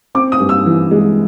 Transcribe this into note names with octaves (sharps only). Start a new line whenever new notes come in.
C4 D6
D#6
G2
E6
E3
G#3